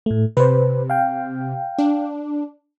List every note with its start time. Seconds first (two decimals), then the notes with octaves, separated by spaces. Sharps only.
0.06 A2 A3
0.37 C3 B4 C5
0.90 F5 G5
1.78 D4